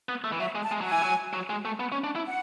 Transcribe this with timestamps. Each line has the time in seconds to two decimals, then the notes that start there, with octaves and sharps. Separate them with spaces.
0.09 B3
0.24 A3
0.32 E3
0.39 F#3 E5
0.55 G#3
0.63 A5
0.72 G#3
0.81 F#3
0.86 G#5
0.92 E3
1.02 F#3
1.33 F#3
1.50 G#3
1.65 A3
1.80 B3
1.92 C#4
2.04 D4
2.16 E4
2.27 F#5